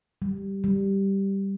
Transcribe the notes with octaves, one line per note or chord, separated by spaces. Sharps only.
G3
G3